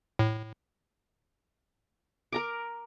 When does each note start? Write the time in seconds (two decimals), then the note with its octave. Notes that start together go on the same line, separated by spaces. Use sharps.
0.19 A2
2.32 A#4 A#5 D6